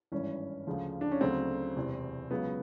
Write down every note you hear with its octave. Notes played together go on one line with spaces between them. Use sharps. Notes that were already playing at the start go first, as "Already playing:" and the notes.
G#1 G2 E3 C#4
D2 C#3 F3
D4
C#4
D2 C#3 F#3 A3 C4
E1 E2 C3
C#2 C#3 F#3 B3